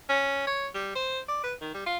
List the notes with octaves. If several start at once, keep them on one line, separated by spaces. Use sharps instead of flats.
C#4
C#5
G3
C5
D5
B4
D#3
G3
F4